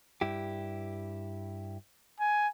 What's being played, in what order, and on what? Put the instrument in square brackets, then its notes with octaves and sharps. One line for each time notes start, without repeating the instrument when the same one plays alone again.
[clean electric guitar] G2 E4 G4
[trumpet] G#5